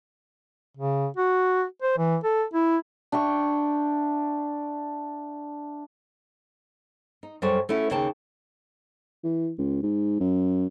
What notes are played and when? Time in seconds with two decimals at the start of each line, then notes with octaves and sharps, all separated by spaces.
0.77 C#3
1.17 F#4
1.82 C5
1.98 E3
2.24 A4
2.54 E4
3.12 D4 E5 G5 C#6
7.23 D#4
7.42 F#2 G3 A4 C5 C#5
7.69 A3 C#4 E4 F#4
7.90 D#2 C#3 A#3 C#5 G5 A5
9.23 E3
9.59 C#2
9.82 G#2
10.20 F#2